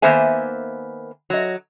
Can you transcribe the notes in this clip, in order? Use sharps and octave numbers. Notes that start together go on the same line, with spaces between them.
D#3 A#3 B3 C5 E5 G#5
F#3 D#5